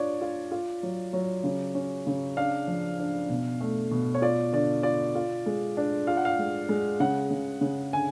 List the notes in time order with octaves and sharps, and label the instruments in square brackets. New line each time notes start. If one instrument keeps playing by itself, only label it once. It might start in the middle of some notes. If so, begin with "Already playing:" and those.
Already playing: [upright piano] D4 F4 C#5 D5
F4
F4
F#3
F#3
C#3
C#4
C#3
D4 F5
F3
D4
B2
A3
B2
C#5
F4 D5
D3 D5
F4 D5
F4
G#3
D4
F4 F5
F#5
F5
G#3
G#3
C#3 F#5
C#3
C#3
D3 G#5